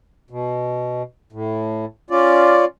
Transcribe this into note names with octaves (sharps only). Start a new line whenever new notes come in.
B2
A2
C#4 F4 D5